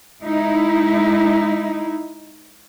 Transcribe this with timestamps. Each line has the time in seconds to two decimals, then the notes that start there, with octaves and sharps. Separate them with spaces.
0.22 G#3 D#4 E4